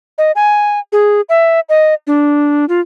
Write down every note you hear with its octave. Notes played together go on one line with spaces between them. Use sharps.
D#5
G#5
G#4
E5
D#5
D4
F4